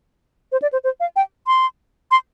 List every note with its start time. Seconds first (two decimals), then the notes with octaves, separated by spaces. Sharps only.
0.52 C5
0.62 D5
0.73 C5
0.84 C5
1.00 F5
1.16 G5
1.47 C6
2.11 C6